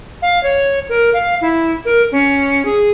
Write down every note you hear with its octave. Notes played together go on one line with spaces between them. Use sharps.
F5
C#5
A#4
F5
E4
A#4
C#4
G#4